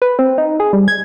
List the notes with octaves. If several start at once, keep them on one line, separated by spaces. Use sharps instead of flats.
B4
C4
D#4
G#4
G3
G#6